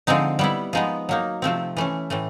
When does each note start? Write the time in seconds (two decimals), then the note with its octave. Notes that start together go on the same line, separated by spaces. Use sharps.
0.07 D3 F3 G#3 C4 D#4
0.39 G3 B3 E4
0.73 F3 G#3 B3 D#4
1.09 F#3 A#3 D#4
1.42 C3 F3 A3 C4
1.77 E3 A3 C#4
2.10 A2 E3 A3